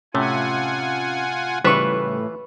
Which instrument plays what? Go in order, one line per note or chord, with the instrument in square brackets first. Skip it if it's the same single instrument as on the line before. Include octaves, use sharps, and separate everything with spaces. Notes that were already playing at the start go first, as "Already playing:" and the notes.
[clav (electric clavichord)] A2 C3 A3 [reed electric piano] C#4 [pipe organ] F4 F#5 G#5
[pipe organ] A2 [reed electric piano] C#3 G3 [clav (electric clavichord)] E3 F4 E5 [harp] B4 C#6